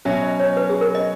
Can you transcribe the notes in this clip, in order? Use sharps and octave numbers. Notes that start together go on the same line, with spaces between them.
B2 F#3 C#4 E5
D#5
C#5
B4
G#4
A#4
D#5